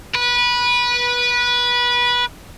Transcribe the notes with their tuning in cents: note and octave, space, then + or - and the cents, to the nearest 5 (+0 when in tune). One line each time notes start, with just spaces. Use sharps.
B4 -20